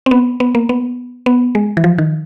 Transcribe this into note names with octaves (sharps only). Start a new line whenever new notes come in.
C4
B3
B3
A#3
B3
B3
G#3
E3
F3
D#3